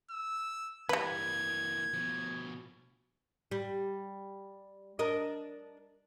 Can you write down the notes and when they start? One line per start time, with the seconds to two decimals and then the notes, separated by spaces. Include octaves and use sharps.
0.11 E6
0.89 E3 G3 A#3 B4 G#6
1.94 B2 F3
3.51 G3
4.99 D4 A#4 D#5